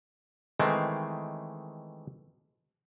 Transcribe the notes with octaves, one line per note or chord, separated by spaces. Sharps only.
D#3 E3 G#3 A3 C4